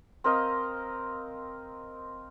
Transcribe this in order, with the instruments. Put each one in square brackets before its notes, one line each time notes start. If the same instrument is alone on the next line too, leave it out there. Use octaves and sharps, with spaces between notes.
[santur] C4 A#4 D#5 F5